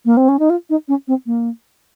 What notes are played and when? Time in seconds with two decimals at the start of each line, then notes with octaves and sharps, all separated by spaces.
0.05 A#3
0.17 C4
0.29 C#4
0.39 D#4
0.50 F4
0.70 D#4
0.88 C#4
1.08 C4
1.26 A#3